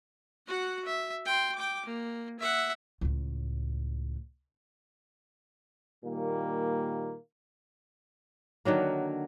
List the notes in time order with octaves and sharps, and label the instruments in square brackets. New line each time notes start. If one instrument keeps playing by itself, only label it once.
[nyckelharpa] F#4 F#5
E5
G5 C6
G5 D6
A#3
E5 F#5
[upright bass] C#2 A2
[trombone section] A#2 D#3 G3 A#3
[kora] D3 D#3 F#3 A#3